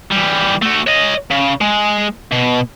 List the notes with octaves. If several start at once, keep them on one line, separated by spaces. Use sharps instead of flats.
E3 G3
A3 F#4
C#5 D#5
C#3
G#3
B2